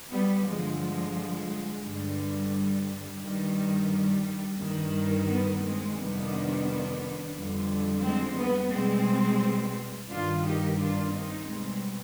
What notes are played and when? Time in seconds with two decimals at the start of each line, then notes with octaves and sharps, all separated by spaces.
0.12 G3 B3
0.47 G2 D3 F3 G#3
0.81 G#3
1.85 G2 D3 G3
2.53 G3
3.22 G2 D#3 G3
3.91 G3
4.59 G2 D#3 G3
5.28 G3 B3
5.63 G#3 C4
5.97 F2 C3 D#3 G3 B3 D4
7.35 F2 D3 G3
8.03 G#3 C4
8.38 G3 B3
8.72 B2 G3 G#3 C4
10.10 G2 D#3 G3 D4 F4
10.44 D#4 G4
10.78 D4 F4
11.12 C4 D#4
11.47 B2 G3 G#3 C4